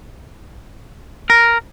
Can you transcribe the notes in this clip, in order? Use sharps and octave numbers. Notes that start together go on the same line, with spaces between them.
A#4